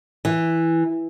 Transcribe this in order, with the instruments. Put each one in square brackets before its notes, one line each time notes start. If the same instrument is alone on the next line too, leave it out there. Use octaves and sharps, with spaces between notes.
[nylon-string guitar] E3